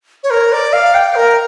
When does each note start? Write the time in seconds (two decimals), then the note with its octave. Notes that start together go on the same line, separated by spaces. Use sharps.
0.23 C#5
0.30 A#4
0.52 D5
0.73 F5
0.94 G5
1.15 A#4